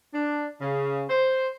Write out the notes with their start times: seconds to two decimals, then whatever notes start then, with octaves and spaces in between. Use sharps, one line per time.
0.14 D4
0.62 C#3
1.10 C5